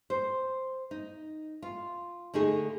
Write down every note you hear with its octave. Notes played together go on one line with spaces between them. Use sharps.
C5
D#4
F4
D3 A3 D#4 G#4